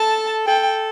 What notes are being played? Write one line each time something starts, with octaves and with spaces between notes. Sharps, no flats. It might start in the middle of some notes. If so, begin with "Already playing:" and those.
Already playing: A4 A5
A4 G5